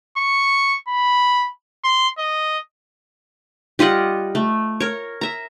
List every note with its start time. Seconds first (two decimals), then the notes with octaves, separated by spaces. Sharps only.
0.17 C#6
0.88 B5
1.84 C6
2.19 D#5
3.79 G3 F4 D#5 F#5
4.35 A3
4.80 A#4 C#5
5.21 E5 A#5